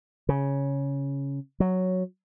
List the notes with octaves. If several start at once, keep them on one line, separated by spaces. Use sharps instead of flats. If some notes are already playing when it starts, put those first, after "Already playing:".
C#3
F#3